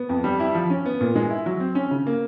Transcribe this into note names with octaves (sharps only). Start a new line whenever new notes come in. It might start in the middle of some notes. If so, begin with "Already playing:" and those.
Already playing: B3
F2
G3
E4
F3
C#4
B3
A#2
G#3
E4
F#3
C4
C#4
C#3
A#3